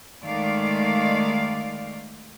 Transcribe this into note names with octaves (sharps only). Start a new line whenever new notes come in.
D#3 G#3 A3 D5 F5